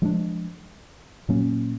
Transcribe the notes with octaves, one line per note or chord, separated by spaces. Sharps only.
F3 G#3 B3 D4
A#2 F#3 A#3 C#4